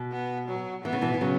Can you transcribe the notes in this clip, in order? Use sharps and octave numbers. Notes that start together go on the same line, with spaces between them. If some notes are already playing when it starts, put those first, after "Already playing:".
Already playing: B2
B3
F#3
E3 B3
C#3
B2 E3
E3
C#3 F#3